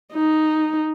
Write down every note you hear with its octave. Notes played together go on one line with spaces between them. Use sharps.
D#4